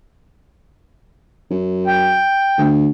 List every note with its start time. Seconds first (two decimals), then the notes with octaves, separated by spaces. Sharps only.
1.51 F#2
1.87 G5
2.58 D2